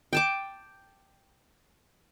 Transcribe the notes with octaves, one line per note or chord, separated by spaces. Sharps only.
G5 A5 D6